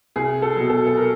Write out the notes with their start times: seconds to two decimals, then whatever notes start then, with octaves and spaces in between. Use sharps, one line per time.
0.16 C2 G#4
0.42 A4
0.56 B2 F#3
0.70 A4
0.87 A4
0.97 A#4